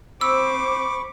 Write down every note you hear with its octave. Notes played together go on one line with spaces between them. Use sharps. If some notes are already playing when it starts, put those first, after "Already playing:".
C4 C5 B5 C#6 D6 E6